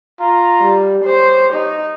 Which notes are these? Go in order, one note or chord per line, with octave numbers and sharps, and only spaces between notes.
F4 A#5
G3
G4 C5 C#5
D#4